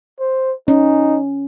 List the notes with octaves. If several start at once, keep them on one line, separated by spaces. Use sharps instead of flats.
C5
C#4 D#4